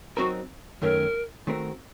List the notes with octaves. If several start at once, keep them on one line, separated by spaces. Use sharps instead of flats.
F#3 C4 D#4 F#4 A#4
F#2 D#3 A3 C#4 A#4
D#3 A3 C4 F#4 A#4